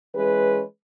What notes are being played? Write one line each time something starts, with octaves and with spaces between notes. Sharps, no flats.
E3 G#3 C#4 G#4 B4